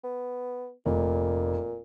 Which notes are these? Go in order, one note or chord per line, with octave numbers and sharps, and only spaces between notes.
B3
F1 A#2